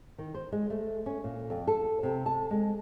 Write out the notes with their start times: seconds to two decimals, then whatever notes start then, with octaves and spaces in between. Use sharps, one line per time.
0.18 D#3
0.35 C5
0.52 G#3
0.70 A3
1.06 C#4
1.24 A#2
1.50 F2
1.67 A4
2.03 C3
2.26 A5
2.51 G#3